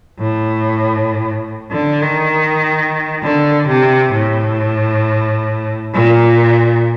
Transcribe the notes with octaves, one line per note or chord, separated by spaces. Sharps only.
A2
D3
D#3
D3
C3
A2
A#2